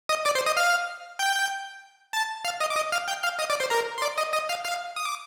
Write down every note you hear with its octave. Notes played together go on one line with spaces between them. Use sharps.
D#5 D#6
D5 D6
C5 C6
D#5 D#6
F5 F6
G5 G6
A5 A6
F5 F6
D#5 D#6
D6
D#5 D#6
F5 F6
G5 G6
F5 F6
D#5 D#6
D5 D6
C5 C6
A#4 A#5
C6
D5 D6
D#5 D#6
D#5 D#6
F5 F6
F5 F6
D#6
D6